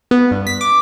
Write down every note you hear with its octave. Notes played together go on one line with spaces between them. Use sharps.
B3
G2
B6
D6